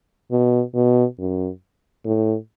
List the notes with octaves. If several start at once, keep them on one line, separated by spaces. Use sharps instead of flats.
B2
B2
F#2
A2